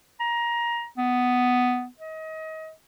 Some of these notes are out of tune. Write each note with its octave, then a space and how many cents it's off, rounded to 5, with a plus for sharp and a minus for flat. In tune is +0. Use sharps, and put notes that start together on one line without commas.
A#5 +20
B3 +10
D#5 +30